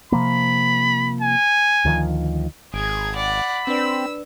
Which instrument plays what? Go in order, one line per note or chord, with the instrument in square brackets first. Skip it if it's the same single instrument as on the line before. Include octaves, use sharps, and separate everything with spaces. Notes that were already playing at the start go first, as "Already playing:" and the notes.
[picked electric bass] C3 F3 A#3 [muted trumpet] B5
[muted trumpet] G#5
[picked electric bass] D2 D#3 F3
[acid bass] G#1 [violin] G#4 G#6 [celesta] D7
[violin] D5 F#5 [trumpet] B5
[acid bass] C4 [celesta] D4 B4 D5 [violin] E6